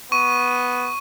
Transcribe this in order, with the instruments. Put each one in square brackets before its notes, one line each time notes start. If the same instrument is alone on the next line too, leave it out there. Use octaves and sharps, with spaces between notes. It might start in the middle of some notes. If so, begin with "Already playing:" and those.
[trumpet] B3 [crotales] C#6 D#7